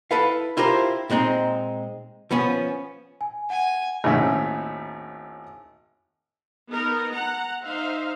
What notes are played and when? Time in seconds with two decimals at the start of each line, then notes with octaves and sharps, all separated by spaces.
0.11 E4 A4 B4 F5
0.57 E4 F4 G4 A#4 C5
1.10 A#2 G#3 C4 D#4
2.31 F3 B3 C#4
3.21 G#5
3.50 F#5 G#5
4.04 G#1 D#2 A2 C#4 D#4 E5
6.70 B3 D#4 A#4
7.14 F#5 A#5
7.63 D#4 C5 E5 F5